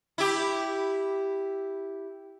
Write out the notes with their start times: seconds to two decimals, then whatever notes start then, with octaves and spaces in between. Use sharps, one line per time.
0.18 E4 G4